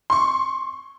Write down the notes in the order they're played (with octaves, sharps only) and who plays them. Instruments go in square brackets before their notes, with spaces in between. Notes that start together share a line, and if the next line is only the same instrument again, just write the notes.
[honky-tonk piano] C6 C#6